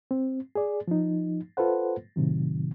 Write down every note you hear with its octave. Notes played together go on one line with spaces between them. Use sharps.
C4
G#4 D5
F3 D#4
F4 A4 B4 C5 F#5
A2 C3 D#3 F#3